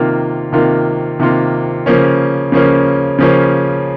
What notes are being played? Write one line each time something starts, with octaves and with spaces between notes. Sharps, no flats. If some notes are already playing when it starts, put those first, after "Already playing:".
Already playing: C3 D#3 A#3 F4
C3 D#3 A#3 F4
C3 D#3 A#3 F4
C#3 F3 A#3 C#4
C#3 F3 A#3 C#4
C#3 F3 A#3 C#4